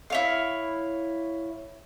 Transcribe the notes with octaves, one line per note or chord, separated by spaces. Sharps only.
E4 C#5 F5